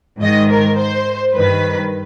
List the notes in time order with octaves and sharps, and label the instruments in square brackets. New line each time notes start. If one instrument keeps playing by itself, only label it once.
[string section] G#2 D#3 D#5
A#4
C5
G2 D#3 B4